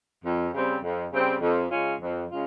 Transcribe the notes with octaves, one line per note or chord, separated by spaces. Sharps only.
F2
C#3 G3 C4
F2
C#3 G3 C4
F2
C#3 G#3 C#4 F4
F2
C#3 G#3 C#4 F4